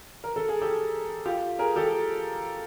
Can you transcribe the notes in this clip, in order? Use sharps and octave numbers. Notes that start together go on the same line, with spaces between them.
A#4
A4
G#4
G4 A4
F4 G4
G#4 A#4
G4 A4